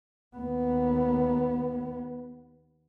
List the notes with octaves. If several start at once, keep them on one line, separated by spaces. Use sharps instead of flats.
D#2 B3